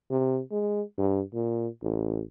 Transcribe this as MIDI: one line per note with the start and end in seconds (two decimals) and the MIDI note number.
0.11 0.41 48
0.51 0.82 56
0.98 1.22 43
1.34 1.68 46
1.82 2.22 33